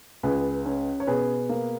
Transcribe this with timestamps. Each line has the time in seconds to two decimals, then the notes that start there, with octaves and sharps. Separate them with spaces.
0.23 C#2 G#4 B4
0.66 C#4
1.00 C#5
1.07 B2 G#4 B4
1.49 A#3